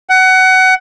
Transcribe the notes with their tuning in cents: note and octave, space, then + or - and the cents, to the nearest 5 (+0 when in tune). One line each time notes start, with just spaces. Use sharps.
F#5 +20